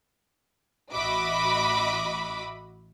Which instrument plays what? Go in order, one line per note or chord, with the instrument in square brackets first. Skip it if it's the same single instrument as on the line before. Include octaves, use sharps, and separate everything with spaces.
[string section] A1 F#4 D#5 E5 B5 D6